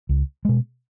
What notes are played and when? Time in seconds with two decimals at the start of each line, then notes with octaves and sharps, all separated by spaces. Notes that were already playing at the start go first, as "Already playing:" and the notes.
0.09 C#2
0.45 B2 G#3